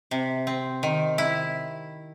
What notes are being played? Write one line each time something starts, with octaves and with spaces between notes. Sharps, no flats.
C3
C4
D#3
E4